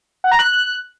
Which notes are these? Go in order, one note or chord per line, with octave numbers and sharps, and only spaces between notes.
F#5
A#5
F#6